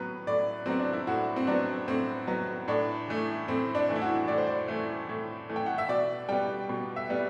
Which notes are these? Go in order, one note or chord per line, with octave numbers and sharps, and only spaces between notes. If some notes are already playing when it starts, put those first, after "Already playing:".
Already playing: A2 F#3 B3 B4
A2 D5
F#3 B3 C4
D4
E4
A2 F#4
C4
F#3 B3 D4
A2 C4
F#3 B3
A2 D4
E3 A3
A2 C4
D4
E3 A3
E4
F#4
A2 D5
C5
D5
E3 A3
A2
E3 A3
G5
F#5
E5
B2 D5
G3 B3 G5
B2
E5
G3 B3